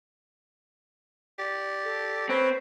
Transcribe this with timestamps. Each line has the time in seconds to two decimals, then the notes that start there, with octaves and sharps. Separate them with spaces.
1.39 G4 D5
1.84 A4
2.29 A#3 C4 B4 C#5